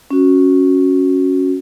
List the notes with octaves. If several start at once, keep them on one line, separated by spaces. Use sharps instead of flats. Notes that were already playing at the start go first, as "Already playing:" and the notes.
C#4 F#4